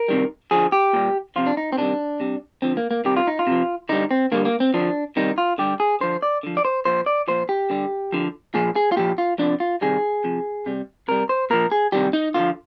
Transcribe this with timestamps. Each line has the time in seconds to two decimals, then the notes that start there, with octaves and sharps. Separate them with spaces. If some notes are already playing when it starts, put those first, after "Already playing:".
Already playing: A#4
0.08 C3 D#3 G3
0.51 D3 F3 G#4
0.72 G4
0.93 A#2 G3
1.36 C3 F3 F4
1.47 D4
1.57 D#4
1.72 C4
1.78 C3 D#3 G3 D4
2.20 C3 G3
2.62 D3 F3 C4
2.77 A#3
2.91 A#3
3.04 C3 D#3 G3 G4
3.17 F4
3.27 D#4
3.39 F4
3.47 C3 F3
3.89 D3 G3 D#4
4.11 C4
4.32 D3 G3 A#3
4.45 A#3
4.60 C4
4.74 D3 F3 D4
5.16 C3 D#3 G3 D#4
5.38 F4
5.58 D3 G3 G4
5.80 G#4
6.01 D3 F3 C5
6.22 D5
6.43 D3 F3
6.57 D5
6.65 C5
6.85 A#2 F3 C5
7.06 D5
7.27 A#2 F3 C5
7.49 G4
7.70 D3 G3
8.12 D3 F3
8.54 A#2 F3 G#4
8.76 G#4
8.92 F4
8.97 A#2 F3 G4
9.18 F4
9.39 C3 F3 D4
9.60 F4
9.81 C3 D#3 G3 G#4
10.24 C3 F3
10.66 C3 G3
11.08 C3 G3 A#4
11.29 C5
11.50 A#2 F3 A#4
11.72 G#4
11.92 C3 D#3 G3 G4
12.13 D#4
12.34 D3 F3 F4